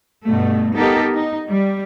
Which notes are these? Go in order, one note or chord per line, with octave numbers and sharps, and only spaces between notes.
G2 B2 A3
B3 D#4 G4 A4 A#4
D#4
G3